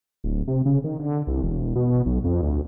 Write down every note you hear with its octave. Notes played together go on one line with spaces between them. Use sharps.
D1
C3
C#3
D#3
D3
C2
E1
B2
B1
F2
D2